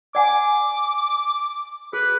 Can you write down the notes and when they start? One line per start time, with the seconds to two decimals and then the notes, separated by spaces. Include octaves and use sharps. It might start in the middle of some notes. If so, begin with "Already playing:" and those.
0.15 D5 F#5 G#5 D6
1.93 G#4 B4